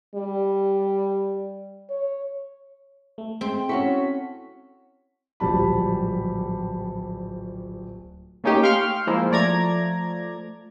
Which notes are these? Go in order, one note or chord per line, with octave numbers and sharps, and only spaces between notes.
G3
C#5
A3
G#3 C4
C#4 E4 F#4 A4 C#6 B6
D1 A#1 G3 G4 A5 B5
A3 A#3 C#4 D#4 G4
F5 G5 C6 C#6 F6 G6
F3 G#3 A#3 E4
F3 A3 D5 A#5 G#6